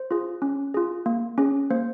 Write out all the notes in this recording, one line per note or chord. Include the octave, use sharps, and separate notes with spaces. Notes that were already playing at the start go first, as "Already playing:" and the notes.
Already playing: C5
F4 G#4
C#4
F4 G#4
A#3
C#4 G#4
A#3 C5